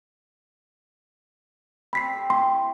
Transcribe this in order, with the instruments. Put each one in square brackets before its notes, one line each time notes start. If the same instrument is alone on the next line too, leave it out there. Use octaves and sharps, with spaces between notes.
[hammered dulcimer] C4 D5 [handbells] B5 B6 C7
[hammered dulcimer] C4 G4 A4
[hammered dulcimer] E4 C#5 [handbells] C6